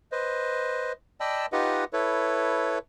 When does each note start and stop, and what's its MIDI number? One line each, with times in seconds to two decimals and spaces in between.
0.12 0.92 71
0.12 0.92 72
0.12 0.92 75
1.20 1.46 74
1.20 1.46 75
1.20 1.46 79
1.20 1.46 81
1.20 1.46 83
1.20 1.46 88
1.53 1.85 63
1.53 1.85 65
1.53 1.85 67
1.53 1.85 71
1.53 1.85 75
1.53 1.85 78
1.93 2.79 64
1.93 2.79 69
1.93 2.79 71
1.93 2.79 73